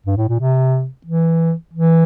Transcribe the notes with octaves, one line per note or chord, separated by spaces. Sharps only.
G2
A2
A#2
C3
E3
E3